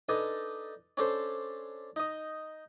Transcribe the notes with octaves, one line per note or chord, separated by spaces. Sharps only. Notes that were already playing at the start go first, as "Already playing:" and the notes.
D4 D#4 A4 B4 G#5
C#4 D4 A4 C5
D#4 D#5